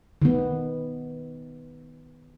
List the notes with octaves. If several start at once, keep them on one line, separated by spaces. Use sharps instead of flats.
D#3 B3